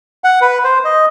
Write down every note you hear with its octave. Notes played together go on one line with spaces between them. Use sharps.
F#5
B4
C5
D#5